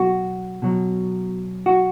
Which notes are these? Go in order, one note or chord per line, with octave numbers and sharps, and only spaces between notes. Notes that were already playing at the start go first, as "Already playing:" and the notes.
Already playing: B2 F#3 F#4
B2 F#3
F#4